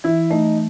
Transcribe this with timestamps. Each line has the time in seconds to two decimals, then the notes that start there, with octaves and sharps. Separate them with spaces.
0.04 E3 E4
0.30 A3 D#4